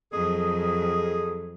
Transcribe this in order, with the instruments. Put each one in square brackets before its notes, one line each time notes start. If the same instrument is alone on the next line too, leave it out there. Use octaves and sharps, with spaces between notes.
[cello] F2 F#3 [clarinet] G#4 [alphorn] A4 [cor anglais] D#5